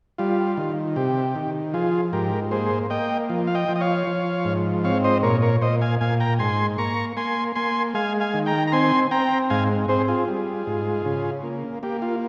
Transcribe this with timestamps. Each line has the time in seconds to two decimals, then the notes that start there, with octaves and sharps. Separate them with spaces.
0.18 G3 F4
0.57 D#3
0.96 C3 G4
1.35 D#3
1.74 F3 F4 G#4
2.12 G#2 G4 A#4
2.51 A#3 G#4 C5
2.90 A#3 D#5 G5
3.30 F3
3.47 F5
3.55 D#5 G5
3.69 F3
3.76 D#5
3.81 C#5 F5
4.07 F3
4.45 G#2
4.84 C4 C#5 F5
5.04 C5 D#5
5.23 A#2 A#4 C#5
5.42 A#4 C#5
5.61 A#2 C5 D#5
5.81 F5 G#5
6.01 A#2 F5 G#5
6.20 G5 A#5
6.39 G#2 G#5 C6
6.78 A#3 A#5 C#6
7.17 A#3 G#5 C6
7.55 A#3 G#5 C6
7.94 G#3 F5 G#5
8.20 F5 G#5
8.34 D#3
8.46 G5 A#5
8.67 A#5
8.72 C4 G#5 C6
9.11 C4 G5 A#5
9.50 G#2 F5 G#5
9.88 C4 G#4 C5
10.08 F4 G#4
10.28 G3
10.67 G#2
11.05 C#3
11.44 A#3
11.83 A#3 G4
12.02 F4